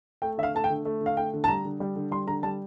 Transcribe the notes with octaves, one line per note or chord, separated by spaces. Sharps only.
A3 G5
D3 E5
F5
A3 A5
G5
D3
A3
D3
F5
A3 G5
D3
A5
G3 A#5
D3
G3
D3
G3 C6
D3 A#5
G3 A5